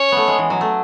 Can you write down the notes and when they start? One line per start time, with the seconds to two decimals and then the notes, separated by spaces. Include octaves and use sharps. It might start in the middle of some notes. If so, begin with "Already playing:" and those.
Already playing: C#4 C#5
0.12 A3 B3
0.28 G#3
0.38 E3
0.50 F#3
0.61 A3